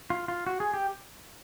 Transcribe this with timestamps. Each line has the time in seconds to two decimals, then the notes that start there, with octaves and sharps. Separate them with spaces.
0.10 F4
0.28 F4
0.47 F#4
0.60 G#4
0.74 G4